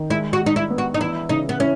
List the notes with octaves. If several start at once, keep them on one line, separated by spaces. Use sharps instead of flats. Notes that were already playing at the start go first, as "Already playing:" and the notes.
Already playing: D#3
G#3 E4
F#4
G#3
D#4
E4
B3
F#4
D#4
E3 E4
C#3 D#4
B3
C#4 E4